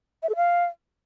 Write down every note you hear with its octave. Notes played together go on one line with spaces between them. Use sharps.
E5
A4
F5